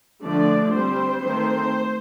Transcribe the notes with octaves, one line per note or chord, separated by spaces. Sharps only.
D3 F3 A3 D5
G3 C4 C5
D#3 A3 C4